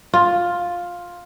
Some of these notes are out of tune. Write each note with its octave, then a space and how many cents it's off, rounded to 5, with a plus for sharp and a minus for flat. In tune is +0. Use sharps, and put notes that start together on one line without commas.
F4 +10